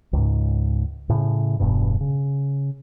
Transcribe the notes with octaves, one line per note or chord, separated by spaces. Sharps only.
C#2 G#2
A2 C#3
E1 G2 B2
C#3